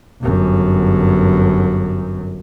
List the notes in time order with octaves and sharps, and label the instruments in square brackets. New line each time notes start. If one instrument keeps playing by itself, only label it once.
[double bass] G1 F#2